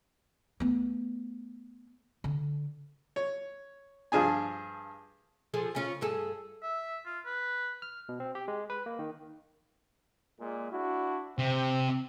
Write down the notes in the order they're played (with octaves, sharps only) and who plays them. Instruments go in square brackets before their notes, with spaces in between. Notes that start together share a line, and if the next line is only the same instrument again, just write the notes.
[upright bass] A3 B3
D3
[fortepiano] C#5
G2 F3 D4 G#4 G#5
[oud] F3 G#4 A4
C#3 C#4 F4
G2 G#4 A4
[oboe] E5
F4
B4
[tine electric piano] F6
B2
C4
G4
G#3
B4
A#3
D#3
[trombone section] A#2 G#3
D4 E4 F#4
[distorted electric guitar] C3 [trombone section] C4